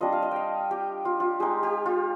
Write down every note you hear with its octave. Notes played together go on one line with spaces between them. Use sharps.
G3 D4 F4 D#5
F5
D#5
F5 G5
G4
F4
F4
G#3 D#4 G4
G4
F4